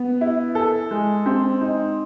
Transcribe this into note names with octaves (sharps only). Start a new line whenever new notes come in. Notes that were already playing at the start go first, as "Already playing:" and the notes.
Already playing: B3
E4
A4
G#3
C4
D#4